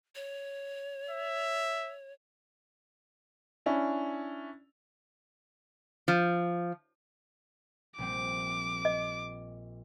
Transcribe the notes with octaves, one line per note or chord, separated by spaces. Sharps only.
C#5
E5
C#4 D4 E4
F3
A#1 G3 C4 D6
D#5